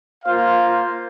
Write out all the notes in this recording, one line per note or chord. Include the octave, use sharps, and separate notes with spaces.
A#3 F4 C5 F5